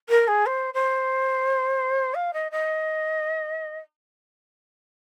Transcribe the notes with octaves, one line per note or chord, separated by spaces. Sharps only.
A#4
G#4
C5
C5
F5
D#5
D#5